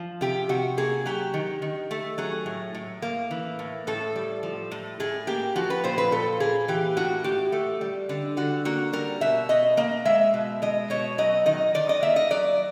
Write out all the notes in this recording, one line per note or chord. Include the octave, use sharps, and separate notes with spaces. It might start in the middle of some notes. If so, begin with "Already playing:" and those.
Already playing: F3
C3 G4
C3 F#4
A#3 G#4
F#3 G4
D#3
D#3
A3
F#3 G#4
A2
A2
A#3
E3
A2
A2 A4
G3
F3
A2
A2 G#4
A#3 G4
F3 F#4
B4
A#2 C5
B4
A#2 A4
A#3 G#4
E3 G4
A2 F#4
A2 G4
A3
G3
D3
D3 F#4
A#3 F#4
G3 A#4
B2 E5
B2 D#5
A#3 D#5
G#3 E5
B2
G#3 D#5
B2 C#5
F#3 D#5
D#3 D#5
D#3 D5
D#5
A#3 E5
D#5
F#3 D5